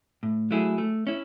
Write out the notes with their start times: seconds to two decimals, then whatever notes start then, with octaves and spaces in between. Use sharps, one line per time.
0.23 A2
0.51 F#3 A3 E4 G#4
0.78 A3
1.07 C#4 E4